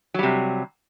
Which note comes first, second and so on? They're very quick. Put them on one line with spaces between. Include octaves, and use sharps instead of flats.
F#3 G3 C3